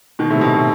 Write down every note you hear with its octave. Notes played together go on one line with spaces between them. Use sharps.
B2 D#3
A2 C3
B2
A2